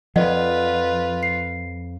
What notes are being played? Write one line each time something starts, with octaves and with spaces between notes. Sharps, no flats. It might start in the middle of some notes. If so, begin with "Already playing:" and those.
F2 F3 F4 B4 D5 D#5 F#5
C7